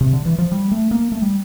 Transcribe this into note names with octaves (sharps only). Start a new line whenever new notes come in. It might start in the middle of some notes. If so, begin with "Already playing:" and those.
C3
D3
E3
F3
G3
A3
A#3
A3
G3